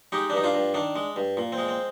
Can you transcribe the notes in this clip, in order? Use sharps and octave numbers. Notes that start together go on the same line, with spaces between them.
G#3 D#4 G4
D4
G2 D#4
D4 F4
G2
D#3 D4
G#3
G2
A#2
C4
G#3
C4